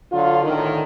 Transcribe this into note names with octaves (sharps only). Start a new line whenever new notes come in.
D3 F#3 F4
A2 D3 D#3